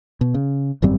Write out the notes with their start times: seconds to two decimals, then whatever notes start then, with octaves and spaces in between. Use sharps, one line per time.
0.21 B2
0.34 C#3
0.82 G#1 F#2 G3 C4